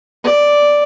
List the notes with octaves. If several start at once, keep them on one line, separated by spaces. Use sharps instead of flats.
D5